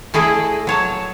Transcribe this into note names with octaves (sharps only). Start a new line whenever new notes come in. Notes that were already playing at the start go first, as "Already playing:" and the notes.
A3 E4 G#4 D5 D#5
F#3 C#5 A5